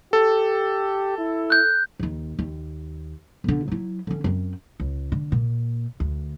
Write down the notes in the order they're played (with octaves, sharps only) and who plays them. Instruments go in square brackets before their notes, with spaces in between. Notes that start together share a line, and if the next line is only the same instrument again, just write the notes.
[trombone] G4 [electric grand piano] A4
[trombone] E4
[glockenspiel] F#6 G6
[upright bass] D#2 D#3
D#2
B1 D3
F#3 E4
D3 C#4
F#2 C4
C#2
D3
A#2
D2